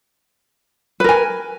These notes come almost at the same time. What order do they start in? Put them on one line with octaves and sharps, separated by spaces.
B4 A#4 G#5